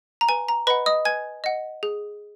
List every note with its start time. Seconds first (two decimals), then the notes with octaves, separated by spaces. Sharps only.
0.21 A#5
0.29 B4 G#5
0.49 A#5
0.67 B4 D#5 F#5 B5
0.86 D#5 D#6
1.05 B4 G#5 G#6
1.44 D#5 F#5
1.83 G#4